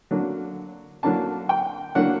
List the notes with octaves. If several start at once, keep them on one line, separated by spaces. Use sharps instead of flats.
D3 F#3 A#3 D4
D3 F#3 A#3 D4 A5
G5
D3 F#3 A#3 D4 F#5